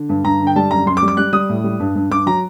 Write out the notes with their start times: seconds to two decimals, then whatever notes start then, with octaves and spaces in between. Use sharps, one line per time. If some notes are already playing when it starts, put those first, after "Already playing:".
Already playing: D3
0.09 G2
0.24 G2 A#5
0.40 D3
0.47 G5
0.56 G3 A5
0.71 F#2 A#5
0.86 F#2 C6
0.97 D6
1.02 G3
1.08 D6
1.17 G3 F#6
1.33 G3 D#6
1.49 A2
1.64 G3
1.80 G2
1.95 G2
2.10 G2 D6
2.26 F#3 A#5